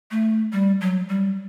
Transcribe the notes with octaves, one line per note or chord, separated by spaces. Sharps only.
A3
G3
F#3
G3